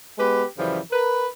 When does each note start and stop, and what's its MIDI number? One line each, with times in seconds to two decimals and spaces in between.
0.18 0.44 56
0.18 0.44 59
0.18 0.44 67
0.18 0.44 71
0.57 0.78 42
0.57 0.78 49
0.57 0.78 52
0.57 0.78 53
0.57 0.78 55
0.91 1.26 70
0.91 1.26 71